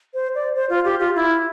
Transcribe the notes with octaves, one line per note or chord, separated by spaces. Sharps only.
C5
D5
C5
F4
G4
F4
E4